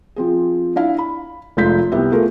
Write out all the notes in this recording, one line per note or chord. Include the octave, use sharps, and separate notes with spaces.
F3 C4 G#4
D4 E4 F5
B5
F1 G#3 F4 G6 B6
C2 B3 G4 E5
A3 F4 G#4 A#4